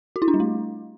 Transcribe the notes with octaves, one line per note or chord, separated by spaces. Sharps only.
F#4
E4
D4
G3
A3